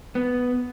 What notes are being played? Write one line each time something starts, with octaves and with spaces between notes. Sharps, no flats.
B3